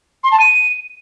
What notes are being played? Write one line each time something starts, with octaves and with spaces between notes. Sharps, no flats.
C6
A5
D#7